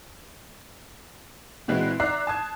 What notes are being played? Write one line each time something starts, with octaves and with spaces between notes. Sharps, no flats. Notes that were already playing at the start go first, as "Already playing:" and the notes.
A#2 E3 G#3 C4 E4 F#4
D5 E5 A#5 F#6 C7
A5 D#6 G#6